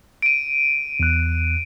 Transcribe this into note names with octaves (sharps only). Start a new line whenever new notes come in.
D7 D#7
E2 F#6